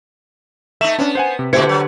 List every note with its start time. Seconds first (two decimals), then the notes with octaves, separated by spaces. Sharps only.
0.81 A3 D#4 E5 E7
0.99 B3 C#4 D4
1.15 C5 F#5 G#5
1.39 C3
1.53 A#2 D3 E4 G4 C5 G#6 C#7
1.69 F#3